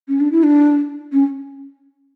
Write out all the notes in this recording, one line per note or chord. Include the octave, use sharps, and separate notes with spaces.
C#4
D4
E4
D4
C#4